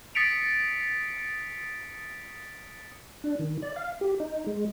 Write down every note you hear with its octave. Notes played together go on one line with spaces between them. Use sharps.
D#6 A6 B6 C#7 D7 F7
D4
D#3
D5
F5
G4
D#4
G#3